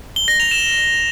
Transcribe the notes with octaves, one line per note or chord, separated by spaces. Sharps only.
G7
A#6
F7
E7